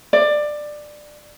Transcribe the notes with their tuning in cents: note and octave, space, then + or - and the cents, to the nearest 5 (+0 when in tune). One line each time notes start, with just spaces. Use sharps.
D5 +15